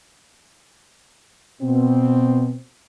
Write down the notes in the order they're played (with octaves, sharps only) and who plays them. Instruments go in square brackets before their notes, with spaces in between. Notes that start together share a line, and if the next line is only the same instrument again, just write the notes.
[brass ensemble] B2 C4